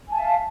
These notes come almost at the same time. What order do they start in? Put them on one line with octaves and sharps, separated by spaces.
G#5 A5 E5 F5